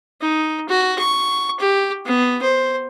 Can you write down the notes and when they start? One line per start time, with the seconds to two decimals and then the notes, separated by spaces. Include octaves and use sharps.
0.21 D#4
0.69 F#4
0.99 C#6
1.60 G4
2.06 B3
2.43 C5